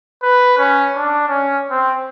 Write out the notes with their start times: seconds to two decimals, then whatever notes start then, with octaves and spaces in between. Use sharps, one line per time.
0.23 B4
0.58 C#4
0.97 D4
1.28 C#4
1.71 C4